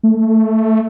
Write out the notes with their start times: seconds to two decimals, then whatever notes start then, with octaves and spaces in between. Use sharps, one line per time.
0.03 A3